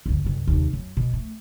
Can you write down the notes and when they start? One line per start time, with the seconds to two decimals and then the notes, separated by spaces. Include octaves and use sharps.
0.06 G1 D2
0.24 C2 F#2
0.47 D#2 C3
0.73 F#2
0.97 B2
1.13 A3